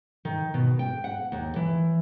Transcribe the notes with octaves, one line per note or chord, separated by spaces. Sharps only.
D#3
B2
G5
F#5
D#2
E3